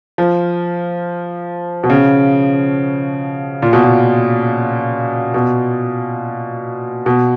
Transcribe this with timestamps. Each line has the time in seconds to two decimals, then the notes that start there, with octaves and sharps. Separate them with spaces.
0.18 F3
1.83 B2
1.90 C#3
3.62 A#2
3.73 B2
3.84 A#2
5.34 B2
7.06 B2